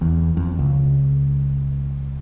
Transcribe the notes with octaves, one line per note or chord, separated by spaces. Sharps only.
E2
F2
C#2